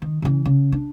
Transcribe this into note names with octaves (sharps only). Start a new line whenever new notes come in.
D#3
C#3 E3
C#3
D4